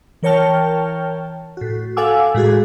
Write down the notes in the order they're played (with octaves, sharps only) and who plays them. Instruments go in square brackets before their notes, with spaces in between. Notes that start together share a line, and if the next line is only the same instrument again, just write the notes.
[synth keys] E3 A#4 C#5 G5 A5 F6
A2 F#4
A4 F5 F#5 G#5 D6 E6
A2 G#3 F#4 G#4